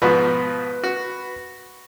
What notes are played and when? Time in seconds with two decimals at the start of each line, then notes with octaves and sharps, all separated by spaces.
0.02 G#2 B2 F3 B4
0.84 F#4